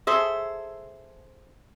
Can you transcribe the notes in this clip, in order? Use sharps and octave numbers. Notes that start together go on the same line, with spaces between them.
G#4 A4 C5 E5